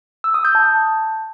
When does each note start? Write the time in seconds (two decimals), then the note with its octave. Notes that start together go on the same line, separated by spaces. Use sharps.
0.24 E6
0.34 D#6
0.45 G6
0.55 A5